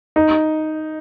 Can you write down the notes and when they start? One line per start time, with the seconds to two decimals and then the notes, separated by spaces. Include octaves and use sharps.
0.16 D#4